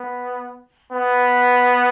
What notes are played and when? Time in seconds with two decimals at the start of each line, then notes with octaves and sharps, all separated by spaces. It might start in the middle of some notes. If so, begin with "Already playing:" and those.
Already playing: B3
0.92 B3